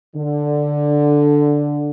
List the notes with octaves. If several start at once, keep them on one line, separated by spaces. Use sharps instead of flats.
D3